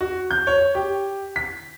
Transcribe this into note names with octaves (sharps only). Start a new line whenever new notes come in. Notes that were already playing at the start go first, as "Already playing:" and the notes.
F#4
G6
C#5
G4
B6